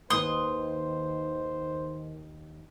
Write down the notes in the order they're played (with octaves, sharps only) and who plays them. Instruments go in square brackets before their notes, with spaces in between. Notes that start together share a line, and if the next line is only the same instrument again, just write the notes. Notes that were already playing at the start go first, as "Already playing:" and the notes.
[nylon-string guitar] D#2 B4 [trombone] D#3 [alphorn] C5 [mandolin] C6 D#6